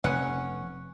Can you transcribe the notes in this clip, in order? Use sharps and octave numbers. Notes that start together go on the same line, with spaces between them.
F1 B3 C#4 F#5